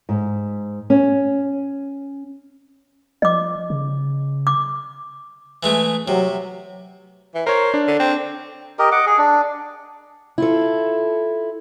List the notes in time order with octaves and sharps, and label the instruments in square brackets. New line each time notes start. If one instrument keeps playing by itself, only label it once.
[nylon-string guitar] G#2
C#4
[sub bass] F3 [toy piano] D#5 D6
[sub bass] C#3
[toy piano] D6
[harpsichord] E3 G#3 A3
[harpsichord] C3 [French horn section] F#3
[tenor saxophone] E3
[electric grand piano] A#4 C#5 [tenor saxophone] C5
[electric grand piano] D4
[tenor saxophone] D3
C4
[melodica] G4 A#4 D#5
D#5 F#5 D6
G#4
D4
[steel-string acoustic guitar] E4 F4 A4